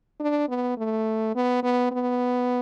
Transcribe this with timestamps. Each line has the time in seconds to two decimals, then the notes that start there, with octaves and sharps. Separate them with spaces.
0.20 D4
0.49 B3
0.78 A3
1.35 B3
1.63 B3
1.92 B3